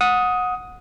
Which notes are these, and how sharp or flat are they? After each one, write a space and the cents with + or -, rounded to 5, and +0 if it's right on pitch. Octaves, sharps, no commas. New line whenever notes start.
F#5 -20 D#6 +10